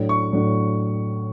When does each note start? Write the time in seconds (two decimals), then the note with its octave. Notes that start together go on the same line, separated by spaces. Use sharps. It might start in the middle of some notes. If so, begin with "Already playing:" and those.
Already playing: A2 F#3 A3 D4
0.09 C#6
0.32 A2 F#3 A3 D4